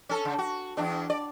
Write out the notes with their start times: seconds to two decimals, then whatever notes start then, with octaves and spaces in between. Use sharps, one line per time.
0.09 C#4 A4
0.25 C#3
0.38 F#4
0.77 E2 D4
1.10 D5